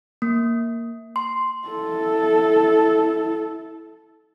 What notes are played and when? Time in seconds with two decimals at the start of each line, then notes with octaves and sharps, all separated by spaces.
0.22 A#3
1.16 C6
1.68 E4 A4